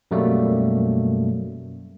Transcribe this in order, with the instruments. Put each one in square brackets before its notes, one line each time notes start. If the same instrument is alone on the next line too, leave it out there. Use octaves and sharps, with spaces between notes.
[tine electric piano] F#2 B2 F#3 G3 A3 A#3